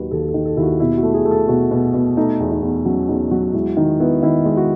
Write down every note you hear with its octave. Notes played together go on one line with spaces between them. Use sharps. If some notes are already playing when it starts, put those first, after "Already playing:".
Already playing: D#2 D#3 F#3 B4
D#2 A4
A4
D#3
A4
D#2 E4
F#4
B2 E4
F#4
A3
G#4
A3
A4
B2 F#4
B2
B2
A3 D#4
E2
D#4
E2
F#3 C#4
E2 D#4
F#3 F#4
G#3 E4
D#3 D#4
B3 E4
D#3 E4
G#3
F#4